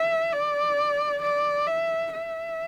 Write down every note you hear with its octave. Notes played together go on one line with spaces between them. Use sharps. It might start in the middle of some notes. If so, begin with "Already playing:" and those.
Already playing: E5
D5
D5
E5
E5